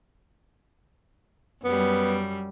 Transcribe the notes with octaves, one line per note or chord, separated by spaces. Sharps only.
F#2 G3 B3